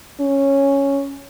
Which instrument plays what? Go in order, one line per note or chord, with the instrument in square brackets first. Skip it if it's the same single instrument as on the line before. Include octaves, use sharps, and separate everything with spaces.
[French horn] C#4